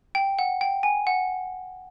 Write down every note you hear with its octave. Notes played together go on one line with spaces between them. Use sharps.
G5
F#5
G5
G#5
F#5